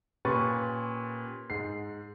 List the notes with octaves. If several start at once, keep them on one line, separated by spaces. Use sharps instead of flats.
A#2 C#4 G4 B4 C#6 A6
G#2 C7